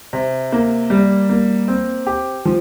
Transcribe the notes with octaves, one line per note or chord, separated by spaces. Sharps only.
C3
A#3
G3
A#3
C4
G4
F3